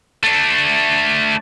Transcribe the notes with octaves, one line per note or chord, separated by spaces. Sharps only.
A3 D4